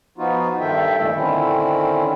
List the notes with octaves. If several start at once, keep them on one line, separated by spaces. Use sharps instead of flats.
F3 B3 D#4 F4 F#4
G2 D#3 A4 E5 G5
F2 A#2 A3 A4
D3 D#3 C4 C#4 E4